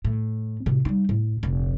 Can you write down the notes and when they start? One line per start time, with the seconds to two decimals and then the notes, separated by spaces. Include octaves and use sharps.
0.05 A2
0.66 A2 C3
0.85 G3 D#4
1.09 A2
1.43 F1 A#1